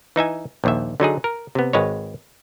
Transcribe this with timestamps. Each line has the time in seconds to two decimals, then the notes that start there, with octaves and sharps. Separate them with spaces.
0.16 E3 D#4 E5 G#5
0.64 A#1 D#2 E5
1.00 D3 F#3 D#4 G#4
1.24 A#4
1.55 C3 B3
1.73 G#1 G#3 B4 C#5